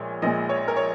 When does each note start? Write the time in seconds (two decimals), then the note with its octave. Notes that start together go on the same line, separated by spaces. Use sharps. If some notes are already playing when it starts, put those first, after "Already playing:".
Already playing: A#1 A#2 G#3 C#5
0.22 A#1 A#2 G#3 D#5
0.49 C#5
0.68 A#4
0.76 C#5